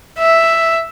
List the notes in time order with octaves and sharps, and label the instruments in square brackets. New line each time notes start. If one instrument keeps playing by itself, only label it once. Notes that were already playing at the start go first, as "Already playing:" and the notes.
[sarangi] E5